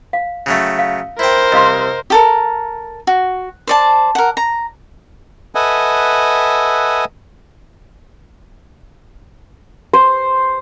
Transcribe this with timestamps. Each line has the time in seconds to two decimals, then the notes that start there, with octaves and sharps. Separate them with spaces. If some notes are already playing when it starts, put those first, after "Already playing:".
0.13 F5
0.46 C#3 F#3 A3
0.79 F5
1.19 E4 A#4 C5 G5
1.52 C2 D#5 F5 C6
2.10 G4 A4 A#4
3.07 F#4
3.67 C5 D5 A5
4.15 A#4 F#5
4.37 A#5
5.55 A4 B4 D#5 E5 F#5 G#5
9.93 C5